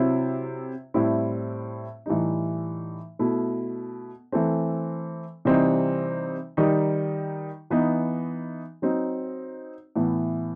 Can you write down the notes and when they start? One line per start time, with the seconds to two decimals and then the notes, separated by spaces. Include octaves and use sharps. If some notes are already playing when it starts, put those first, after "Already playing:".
Already playing: C3 F#3 C4 E4
0.94 A2 G3 C4 E4
2.06 A2 E3 G3 D#4
3.19 B2 A3 E4
4.32 E3 A3 C4
5.45 C3 E3 G3 C4 D#4
6.57 D#3 G3 D#4
7.70 E3 B3 D#4
8.82 F#3 C4 D#4
9.96 A2 E3 B3